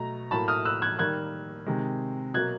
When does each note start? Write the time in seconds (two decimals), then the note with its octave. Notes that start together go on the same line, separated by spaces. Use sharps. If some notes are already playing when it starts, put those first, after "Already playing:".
Already playing: B2 F#3 A3 A#5
0.31 A2 F#3 A#3 A5 B5
0.48 D#6 F6
0.65 E6 F#6
0.82 F#6 G#6
0.99 D#3 G3 A#3 F#6 G#6
1.66 C3 D#3 G#3
2.34 B2 F#3 A#3 F#6 G#6